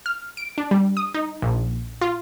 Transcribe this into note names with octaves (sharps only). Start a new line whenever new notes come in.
F6
D7
D4
G3
D#6
D#4
A#1
F4